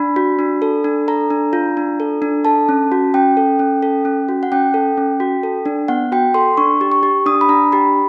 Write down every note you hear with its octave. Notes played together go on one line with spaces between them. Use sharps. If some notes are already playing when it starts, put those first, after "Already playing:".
Already playing: D4 B5
F#4
D4
A4
D4
A4 A#5
D4
F4
D4
A4
D4
A4 A5
C#4
F#4
C#4 G5
A4
C#4
A4
C#4
F#4
F#5
C#4 G5
A4
C#4
F#4
A4
D4
B3 F#5
F#4 G5
A4 C6
D4 C#6
G4
C#6
G4
D4 D#6
B5
D4 A#5
G4 B5